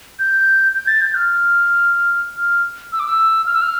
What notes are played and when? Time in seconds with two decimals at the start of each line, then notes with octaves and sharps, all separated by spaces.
0.19 G6
0.75 G6
0.87 A6
1.01 G6
1.15 F6
2.37 F6
2.92 E6
3.00 D6
3.06 E6
3.46 F6
3.53 E6
3.62 F6